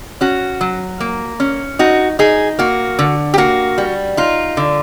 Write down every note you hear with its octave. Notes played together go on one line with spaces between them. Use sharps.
C#4 F#4
F#3
A#3
C#4
D#4 F#4
D#4 G#4
A#3 F#4
D3
G4
A#3 F#4
G3
D#4 F4
D3